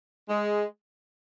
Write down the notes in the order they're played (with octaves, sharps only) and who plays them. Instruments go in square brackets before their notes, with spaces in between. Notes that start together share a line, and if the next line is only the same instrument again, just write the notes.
[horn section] G#3